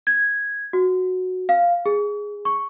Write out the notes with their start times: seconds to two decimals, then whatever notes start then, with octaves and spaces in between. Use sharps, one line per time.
0.07 G#6
0.73 F#4
1.49 F5
1.86 G#4
2.45 C#6